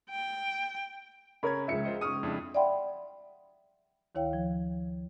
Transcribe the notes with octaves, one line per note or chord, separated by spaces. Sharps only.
G5
C#3 C#4 A#4 C#5 B5 G#6
C#2 F3 E5 C#7
F4 C5 D#5
C#6 D#6 F6 D#7
F2 D4 E4
D5 E5 F#5 G5 B5 C6
D2 D#3 E4 C#5 F5 G5
F3